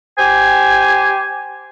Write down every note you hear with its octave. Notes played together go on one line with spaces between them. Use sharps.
G4 C5 G#5